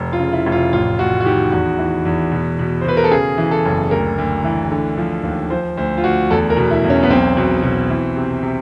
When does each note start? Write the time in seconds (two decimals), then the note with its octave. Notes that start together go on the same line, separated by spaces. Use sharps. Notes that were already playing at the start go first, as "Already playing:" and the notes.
Already playing: F1
0.13 F4
0.19 C#3
0.32 E4
0.46 F1
0.52 F4
0.72 A1 F4
0.98 A1 F#4
1.21 F#4
1.26 D#3 G4
1.52 E2 F#4
1.78 E3
2.05 E2
2.32 B2
2.59 B2
2.81 C5
2.85 B2 B4
2.97 A#4
3.04 A4
3.11 C#3 G#4
3.38 E3
3.51 A4
3.65 F#1
3.91 D2 A#4
4.18 D2
4.44 E3
4.71 D3
4.98 F3
5.23 D#2
5.50 F3 C5
5.77 D2 C5
5.98 F4
6.04 D2 F#4
6.30 E2 A4
6.50 A#4
6.57 B2
6.70 E4
6.84 E2
6.90 C#4
7.03 B3
7.10 B1 C4
7.37 B2
7.62 B2
7.90 E3
8.16 C3
8.43 C3